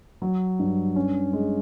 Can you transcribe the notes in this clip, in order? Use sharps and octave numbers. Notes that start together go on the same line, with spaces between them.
F#3
G2
C#4
G#3